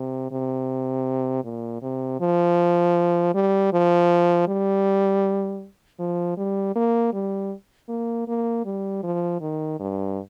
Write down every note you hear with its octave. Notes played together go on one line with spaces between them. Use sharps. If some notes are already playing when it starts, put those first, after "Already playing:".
Already playing: C3
C3
A#2
C3
F3
G3
F3
G3
F3
G3
A#3
G3
A#3
A#3
G3
F3
D#3
G2